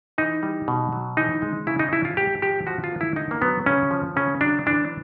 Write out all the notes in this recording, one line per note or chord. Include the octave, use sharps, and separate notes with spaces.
E3 D#4
G3
B2
F#3
E3 D#4
G#3
C#3 E4
D#4
F3 E4
F4
G#2 G4
F3 G4
F3 F#4
F4
A#3
E4
D3 D#4
A#3
F#3 B3
C#3 C#4
F3
C#3 C#4
F#3 D4
E3 D4